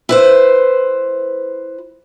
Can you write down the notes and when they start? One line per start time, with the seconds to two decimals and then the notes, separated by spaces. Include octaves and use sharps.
0.09 E4 B4 C5